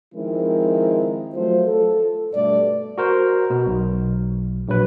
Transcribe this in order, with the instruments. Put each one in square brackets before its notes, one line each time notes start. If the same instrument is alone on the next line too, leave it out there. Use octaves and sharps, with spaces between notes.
[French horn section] D#3 F3 G#3 C4 E4 A#4
F3 F#3 A3 F4 C5
A4
G2 B2 A3 D5
[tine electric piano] F#4 A#4 C5
B2
B1
A#1 F#3 B4